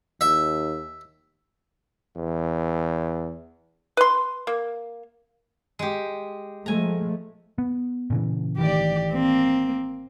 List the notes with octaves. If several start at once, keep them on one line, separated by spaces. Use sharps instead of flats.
D#2 E5
E2
B4 C6
A#3
G#3 G4
F3 G#3 A3 G#5 A#5
B3
A#2 C#3 E3
A1 D#3 E3 G4 D5
A#3 C4